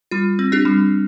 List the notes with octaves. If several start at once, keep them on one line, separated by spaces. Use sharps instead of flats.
G3 F4
C4
D4 G4
G3